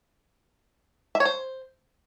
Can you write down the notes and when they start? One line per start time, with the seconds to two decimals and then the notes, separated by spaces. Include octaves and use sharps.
1.15 E5
1.20 C#5
1.25 C5